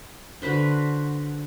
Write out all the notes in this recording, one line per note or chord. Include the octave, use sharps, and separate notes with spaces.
D3 F#4 B4 C5